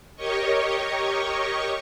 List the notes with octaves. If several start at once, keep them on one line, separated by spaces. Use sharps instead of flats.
G4 A#4 C#5 D#5 C#6